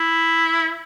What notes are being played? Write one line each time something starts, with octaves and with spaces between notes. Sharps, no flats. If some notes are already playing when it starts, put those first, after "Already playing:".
Already playing: E4